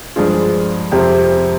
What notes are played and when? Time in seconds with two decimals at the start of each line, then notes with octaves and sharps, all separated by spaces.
0.16 G2 F3 G#3 D4 F4 G#4
0.92 F2 C3 F3 C4 G4